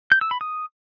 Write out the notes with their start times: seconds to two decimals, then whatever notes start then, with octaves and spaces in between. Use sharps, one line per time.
0.12 G6
0.21 E6
0.31 B5
0.41 D#6